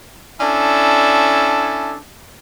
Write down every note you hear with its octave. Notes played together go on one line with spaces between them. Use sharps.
C#4 D4 E4 A4